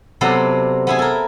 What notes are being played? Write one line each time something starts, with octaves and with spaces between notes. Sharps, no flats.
C3 F#3 B3 A4 D5 C6
B3 E4 G#4
A4 A#4